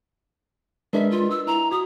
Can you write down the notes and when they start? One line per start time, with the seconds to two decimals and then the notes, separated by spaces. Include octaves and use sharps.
0.93 G#3 D4 A#4 B4 D#5 E5
1.11 F4
1.30 E6
1.47 E4 A#5
1.72 F#4 D#6